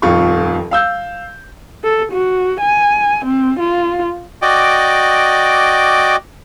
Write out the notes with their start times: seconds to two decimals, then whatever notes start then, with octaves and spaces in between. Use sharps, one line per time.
0.02 D#1 F2 F4 C#6
0.71 F5 E6 G6
1.84 A4
2.12 F#4
2.61 G#5
3.25 C4
3.59 F4
4.42 F#4 D5 D#5 G5 D6